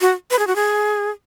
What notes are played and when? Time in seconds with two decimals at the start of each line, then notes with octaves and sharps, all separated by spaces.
0.01 F#4
0.31 B4
0.39 G#4
0.47 F#4
0.56 G#4